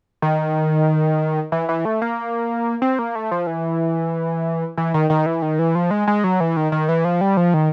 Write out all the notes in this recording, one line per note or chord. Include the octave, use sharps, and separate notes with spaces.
D#3
E3
E3
A3
A#3
C4
A#3
A3
F3
E3
E3
D#3
D#3
E3
D#3
E3
F3
G#3
G#3
F#3
E3
D#3
D#3
E3
F3
G3
F3
D#3